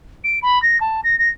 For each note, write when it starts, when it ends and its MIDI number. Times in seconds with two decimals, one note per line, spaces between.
0.24 0.39 98
0.42 0.61 83
0.62 0.78 94
0.80 1.01 81
1.04 1.18 94
1.18 1.29 94